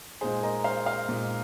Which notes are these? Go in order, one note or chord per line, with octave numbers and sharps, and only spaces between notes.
A#2 G#3 D#4 G#4 C5
A#4 D#5
C5 F5
C5 F5
A#2 G#3 D#4